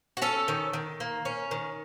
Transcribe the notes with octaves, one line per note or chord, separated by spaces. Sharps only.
F#4
C#4 A4
D#3
D#3
A#3
C#4
D#3